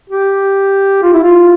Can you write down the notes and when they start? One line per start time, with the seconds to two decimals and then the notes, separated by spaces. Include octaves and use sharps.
0.10 G4
1.03 F4
1.13 E4
1.24 F4